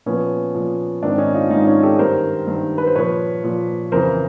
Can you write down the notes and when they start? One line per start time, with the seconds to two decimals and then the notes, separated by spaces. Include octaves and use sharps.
0.06 A#2 F3 B3 C#4
0.54 A#2 F3
1.03 G#2 D#3 C4 D4
1.18 C#4 D#4
1.34 D#4 F4
1.50 G#2 D#3 D#4 F4
1.66 C#4 D#4
1.83 G4 A4
1.99 G2 D#3 A#4 C5
2.47 G2 D#3
2.78 B4
2.87 C5
2.95 A#2 F3 B4 C#5
3.44 A#2 F3
3.92 F2 C#3 E3 A#4 C5